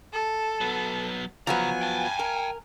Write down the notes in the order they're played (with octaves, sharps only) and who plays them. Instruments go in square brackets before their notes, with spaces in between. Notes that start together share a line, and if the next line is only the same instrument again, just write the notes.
[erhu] A4
[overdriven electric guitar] F#3 B3
[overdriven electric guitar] C#3 A#5 [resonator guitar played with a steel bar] F3 F#3 B3 [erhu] G#5
[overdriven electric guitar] G5 A5
[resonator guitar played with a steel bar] A#4